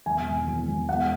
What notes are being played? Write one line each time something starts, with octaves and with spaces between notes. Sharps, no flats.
E1 G#5
E1
E1
E1
E1 F#5